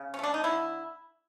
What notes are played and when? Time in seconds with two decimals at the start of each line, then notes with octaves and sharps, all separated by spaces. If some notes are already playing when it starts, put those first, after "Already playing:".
Already playing: C#3
0.14 C#4
0.19 A3 D4
0.34 D#4
0.44 D3 E4